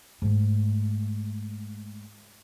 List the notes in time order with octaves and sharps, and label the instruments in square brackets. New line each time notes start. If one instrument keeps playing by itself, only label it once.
[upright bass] G#2 A3